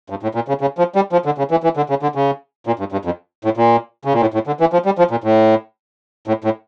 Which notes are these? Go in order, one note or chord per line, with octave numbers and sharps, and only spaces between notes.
G2
A2
A#2
C#3
C#3
F3
G3
F3
D3
C#3
E3
E3
D3
C#3
D3
C#3
A#2
G2
G2
F2
A2
A#2
C#3
A#2
A2
A2
D3
E3
F3
G3
F3
A#2
A2
A2
A2